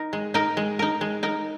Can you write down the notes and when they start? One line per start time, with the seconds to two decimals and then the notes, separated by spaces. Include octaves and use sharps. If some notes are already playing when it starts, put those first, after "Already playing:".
Already playing: D#4 A#4
0.13 G#3
0.34 D#4 A#4
0.57 G#3
0.79 D#4 A#4
1.01 G#3
1.23 D#4 A#4